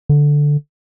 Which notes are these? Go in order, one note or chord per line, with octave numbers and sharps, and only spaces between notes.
D3